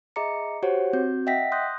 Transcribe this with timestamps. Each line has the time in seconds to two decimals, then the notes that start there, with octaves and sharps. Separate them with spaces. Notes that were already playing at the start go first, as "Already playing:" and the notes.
0.16 G#4 D#5 E5 A#5 D6 C#7
0.63 F#4 G4 C5 C#5 F#5
0.93 C4 F#4 G6
1.27 D#5 E5 F#5 G5 A#6 B6
1.52 C6 D#6 F#6 G6 A#6